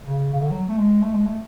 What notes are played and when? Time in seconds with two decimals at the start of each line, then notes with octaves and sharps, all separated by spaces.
0.06 C#3
0.34 C#3
0.42 D3
0.51 F#3
0.69 A3
0.78 G#3
1.02 A3
1.14 G#3
1.26 A3